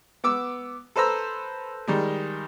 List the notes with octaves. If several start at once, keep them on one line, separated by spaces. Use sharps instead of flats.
B3 D6 E6
A4 B4 C5 A#5 E6
D#3 G3 G#3